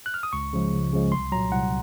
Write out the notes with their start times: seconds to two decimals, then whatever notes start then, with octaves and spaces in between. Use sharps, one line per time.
0.06 F#6
0.14 F6
0.23 D#6
0.33 C#2 C#6
0.53 C#3 F3 G#3
0.73 C#2
0.93 C#3 F3 G#3
1.12 C2 C6
1.32 A#2 F#3 A#5
1.52 C2 F#5